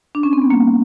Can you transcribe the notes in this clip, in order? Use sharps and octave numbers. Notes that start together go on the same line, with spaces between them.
D4
C#4
C4
B3
G3 A#3